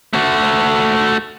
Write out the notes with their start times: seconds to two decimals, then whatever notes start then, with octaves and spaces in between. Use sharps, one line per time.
0.13 A3 F#4